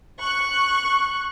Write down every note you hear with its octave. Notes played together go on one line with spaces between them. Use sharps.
C#6 F#6